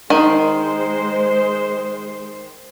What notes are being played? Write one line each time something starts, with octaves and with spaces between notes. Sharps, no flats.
D#3 G#3 C5